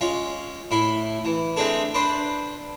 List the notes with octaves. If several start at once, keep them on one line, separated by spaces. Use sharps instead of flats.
G#3 C#4 F4
A2 E4 B5
E3
G#3 A3 C4 D4 G#4 A4
D4 B4 C5 D5